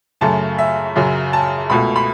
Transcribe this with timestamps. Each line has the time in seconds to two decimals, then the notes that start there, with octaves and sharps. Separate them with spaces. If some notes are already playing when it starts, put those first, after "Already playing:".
0.21 F#2 C#3 A3 A5
0.58 E5
0.96 F#2 C#3 F#3
1.33 A5
1.70 C#2 B2 A3 B5
1.96 B5